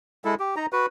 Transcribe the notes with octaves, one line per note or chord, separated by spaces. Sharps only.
G#3 E4 A4
G4
D#4 A#5
F#4 B4